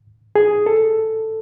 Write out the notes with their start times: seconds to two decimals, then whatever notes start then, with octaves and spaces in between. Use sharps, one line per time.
0.36 G#4
0.66 A4